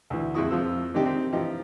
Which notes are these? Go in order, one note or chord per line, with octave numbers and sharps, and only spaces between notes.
D2 E3
F2 G#3 E4 C#6 D#6
F2 F3 E6
C3 D#3 D4 D#4 G4
C4
E3 F3 D#4 G4